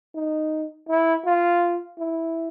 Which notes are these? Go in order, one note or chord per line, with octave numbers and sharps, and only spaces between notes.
D#4
E4
F4
E4